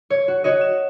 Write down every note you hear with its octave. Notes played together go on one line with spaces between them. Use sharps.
C#5
F#4
F#4 C#5 D#5
E7